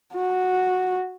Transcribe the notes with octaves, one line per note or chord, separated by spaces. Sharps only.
F#4